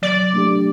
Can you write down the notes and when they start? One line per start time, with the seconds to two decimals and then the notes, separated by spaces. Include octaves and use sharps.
0.02 F#3 D5
0.34 A3 D4 G4